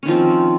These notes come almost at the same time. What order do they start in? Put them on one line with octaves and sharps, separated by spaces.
C#4 D#3 F3 C4